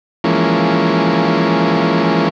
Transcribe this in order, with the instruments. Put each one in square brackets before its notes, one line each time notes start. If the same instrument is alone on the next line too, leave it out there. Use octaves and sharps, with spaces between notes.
[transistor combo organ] E3 F3 G#3 A#3 C#4